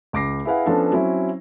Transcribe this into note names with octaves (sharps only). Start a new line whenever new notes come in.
C#2 D6 A#6 C7
E4 G#4 B4 F5 F#5
F3 B3 C#4 D4 F4 A4
F#3 C4 C#4 E4